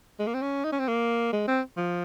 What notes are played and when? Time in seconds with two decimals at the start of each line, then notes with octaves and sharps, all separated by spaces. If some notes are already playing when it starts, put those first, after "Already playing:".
0.19 G#3
0.27 A#3
0.34 C4
0.42 C#4
0.64 D#4
0.72 C#4
0.79 C4
0.88 A#3
1.33 G#3
1.48 C4
1.77 F3